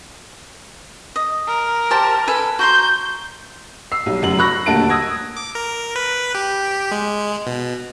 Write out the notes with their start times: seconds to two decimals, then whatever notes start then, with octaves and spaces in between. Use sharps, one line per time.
1.16 D#5
1.47 A#4
1.91 G4 C5 A5
2.27 A4 B4 G#5
2.59 F#4 A#5 C6 G6
3.92 E6 C7
4.06 B1 G3
4.22 F1 F#2 F#7
4.38 B5 C#6 E6 F#6 A#6
4.66 D#1 D2 A#3 A5 D7
4.89 D#6 E6 G#6 A#6
5.37 D6
5.55 A#4
5.96 B4
6.35 G4
6.91 G#3
7.47 B2